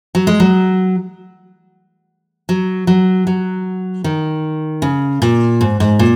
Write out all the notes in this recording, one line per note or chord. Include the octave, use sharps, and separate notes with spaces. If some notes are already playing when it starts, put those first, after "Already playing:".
F#3
G#3
F#3
F#3
F#3
F#3
D#3
C#3
A#2
G#2
G#2
A#2